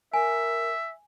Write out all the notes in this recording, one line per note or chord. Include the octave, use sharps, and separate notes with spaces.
A#4 E5 G#5